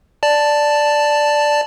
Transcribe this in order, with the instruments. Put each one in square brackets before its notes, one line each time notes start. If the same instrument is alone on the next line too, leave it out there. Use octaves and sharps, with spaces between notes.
[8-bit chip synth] D5 A5